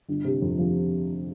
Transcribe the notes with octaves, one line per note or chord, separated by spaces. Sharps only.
G1
C3
F2
F3